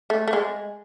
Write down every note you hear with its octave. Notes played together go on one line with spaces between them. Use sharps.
A3
A3
G#3